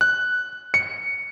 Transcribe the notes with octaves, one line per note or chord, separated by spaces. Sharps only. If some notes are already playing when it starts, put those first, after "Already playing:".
F#6
C#7